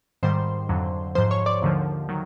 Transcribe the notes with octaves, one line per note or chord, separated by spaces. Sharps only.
G#2 D#3 G3 C5 C6
F2 D3 F#3
G#2 F3 C5 C6
C#5 C#6
D5 D6
D#2 D3 F3
D#3 F#3